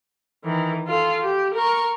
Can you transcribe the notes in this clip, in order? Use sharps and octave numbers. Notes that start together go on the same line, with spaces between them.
D#3 E3
F4 A4
G4
A#4 C#6